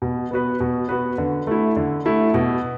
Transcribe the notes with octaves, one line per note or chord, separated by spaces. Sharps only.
B2
B3 F#4 B4
B2
B3 F#4 B4
D3
A3 E4
D3
A3 E4
B2